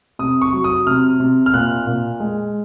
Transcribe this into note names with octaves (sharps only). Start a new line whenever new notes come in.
C3 D#6
C#6
F#3
D#6
C3 F6
C3
F6
A#2 F#6
A#2
G#3